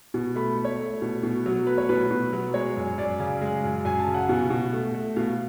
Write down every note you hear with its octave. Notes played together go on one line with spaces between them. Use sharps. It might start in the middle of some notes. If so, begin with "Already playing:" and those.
B2
A3 B5
A3
C#5
A3
B2
B2
F#3
A3 B4
C#5
B2 B4
B2
F#3
G#3 C#5
F#2
F#2 D5
C#3
G#3
F#2
F#2 G#5
A5
C#3
F#5
B2
B2
A3
A3
B2 F5